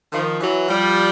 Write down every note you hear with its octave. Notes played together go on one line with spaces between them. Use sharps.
D#3 F3
E3 F#3
F3 G3